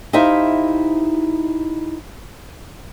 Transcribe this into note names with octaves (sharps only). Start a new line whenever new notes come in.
D#4 E4 G4 C5 E5 F5